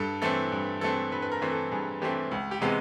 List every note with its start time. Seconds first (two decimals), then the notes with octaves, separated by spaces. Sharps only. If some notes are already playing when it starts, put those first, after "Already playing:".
Already playing: G2 A4
0.22 E3 A3 C4 A4
0.52 G2
0.81 E3 A3 C4 A4
1.12 G2 B4
1.22 B4
1.32 A#4
1.42 E3 A3 C4
1.51 A4
1.72 G2 G#4
2.02 E3 A3 C4 G4
2.31 C#2
2.51 G4
2.61 C3 E3 G#3 B3